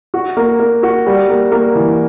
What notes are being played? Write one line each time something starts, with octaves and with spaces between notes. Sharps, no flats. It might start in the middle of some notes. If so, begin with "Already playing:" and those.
F#4
A#3
A#3
F#4
G3
A#3
A#3
E3